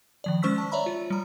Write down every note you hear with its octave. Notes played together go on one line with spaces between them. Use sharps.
D#3 F3 D5
G#3 C#4 C5 C#6 E6 B6
A5
C#5 D5 E5 A#5 B5
F4
G3 A#5